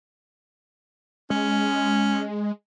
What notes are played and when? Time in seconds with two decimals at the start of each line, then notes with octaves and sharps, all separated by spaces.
1.30 G#3 C#4